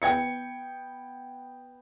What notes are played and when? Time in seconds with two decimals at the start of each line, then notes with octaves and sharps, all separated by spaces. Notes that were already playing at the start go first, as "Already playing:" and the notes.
0.02 B3 G5 G#6 C#7